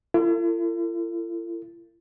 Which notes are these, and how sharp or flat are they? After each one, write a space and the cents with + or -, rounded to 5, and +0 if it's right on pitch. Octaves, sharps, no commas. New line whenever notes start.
E4 +45 A4 +40